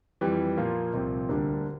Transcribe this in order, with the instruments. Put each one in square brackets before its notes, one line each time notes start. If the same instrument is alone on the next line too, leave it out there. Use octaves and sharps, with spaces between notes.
[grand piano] F2 E3 G3
A#2 F3 A#3 F4
C2 A#2 F3 C4
D2 D3 G3 A#3 D4